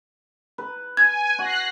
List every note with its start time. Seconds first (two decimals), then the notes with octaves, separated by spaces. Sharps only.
0.58 B4
0.97 G#5 G#6
1.39 F#4 F#6 A#6 C7